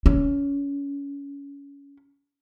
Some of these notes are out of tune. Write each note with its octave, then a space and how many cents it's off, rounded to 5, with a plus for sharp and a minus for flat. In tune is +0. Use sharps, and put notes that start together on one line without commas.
C#4 +25